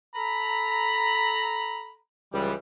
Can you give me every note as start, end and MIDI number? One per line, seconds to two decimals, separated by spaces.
0.15 1.97 69
0.15 1.97 82
0.15 1.97 83
2.32 2.53 37
2.32 2.53 52
2.32 2.53 53
2.32 2.53 55